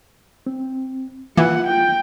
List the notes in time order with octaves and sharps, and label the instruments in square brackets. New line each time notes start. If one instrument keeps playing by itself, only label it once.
[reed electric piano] C4
[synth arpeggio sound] E3 [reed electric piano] A#3 F4 [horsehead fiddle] F#5
[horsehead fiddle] G5